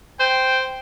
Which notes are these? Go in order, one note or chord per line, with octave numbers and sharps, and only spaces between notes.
C5 G5